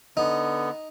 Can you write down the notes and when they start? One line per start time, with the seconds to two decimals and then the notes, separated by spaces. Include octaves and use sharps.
0.17 D3 B3 D#4